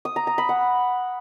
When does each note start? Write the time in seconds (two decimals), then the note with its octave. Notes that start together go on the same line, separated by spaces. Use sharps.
0.05 D#6
0.16 A#5
0.27 A#5
0.38 B5
0.49 F#5